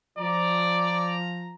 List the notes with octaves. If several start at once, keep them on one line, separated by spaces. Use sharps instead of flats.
F3 D5 A#5